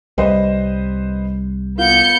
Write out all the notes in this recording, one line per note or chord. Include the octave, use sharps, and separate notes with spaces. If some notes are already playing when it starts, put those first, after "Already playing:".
C2 G3 B4 C5 D#5
B3 F4 G6 C#7